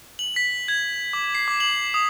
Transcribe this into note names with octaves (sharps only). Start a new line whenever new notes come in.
F#7
B6
G#6
D6
C7
D6
F#7
D#6